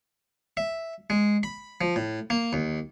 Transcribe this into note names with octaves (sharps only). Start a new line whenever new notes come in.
E5
G#3
B5
F3
A2
A#3
D#2